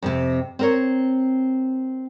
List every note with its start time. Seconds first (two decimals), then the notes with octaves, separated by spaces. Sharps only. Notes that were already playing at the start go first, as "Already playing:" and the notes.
0.02 F2 A2 C3
0.59 C4 A#4 C#5